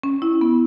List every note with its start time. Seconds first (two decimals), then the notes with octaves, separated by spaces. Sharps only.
0.03 C#4
0.22 E4
0.41 B3